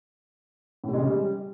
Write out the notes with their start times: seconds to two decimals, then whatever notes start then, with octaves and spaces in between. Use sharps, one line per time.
0.84 A2
0.89 C3
0.94 G#3
0.99 C#3
1.04 G3